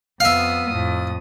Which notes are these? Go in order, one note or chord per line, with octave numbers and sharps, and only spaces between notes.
F2 B3 E5 F5 D#6
F2 A2 D#6